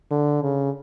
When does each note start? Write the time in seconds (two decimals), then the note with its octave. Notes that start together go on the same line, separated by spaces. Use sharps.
0.11 D3
0.42 C#3